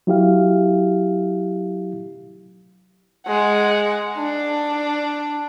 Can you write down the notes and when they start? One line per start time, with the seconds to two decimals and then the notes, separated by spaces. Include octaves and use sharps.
0.07 F#3 E4 G4 F5
3.27 G#3 F#5
4.18 D4